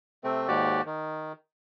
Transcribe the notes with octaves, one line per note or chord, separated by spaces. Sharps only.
C3 A3 C4
D#2 G#2 F#4 G4 D5
D#3